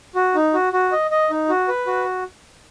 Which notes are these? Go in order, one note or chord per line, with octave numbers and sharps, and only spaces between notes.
F#4
D#4
F#4
F#4
D#5
D#5
D#4
F#4
B4
F#4